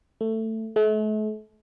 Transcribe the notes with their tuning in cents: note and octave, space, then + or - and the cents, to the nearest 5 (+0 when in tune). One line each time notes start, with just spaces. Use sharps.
A3 +15
A3 -40